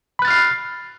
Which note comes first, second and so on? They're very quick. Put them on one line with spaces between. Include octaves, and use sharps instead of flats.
B5 F#6 A6 F6 C7